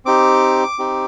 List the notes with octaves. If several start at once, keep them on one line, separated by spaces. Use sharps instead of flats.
C4 D#4 G4 D6
C4 D#4 G4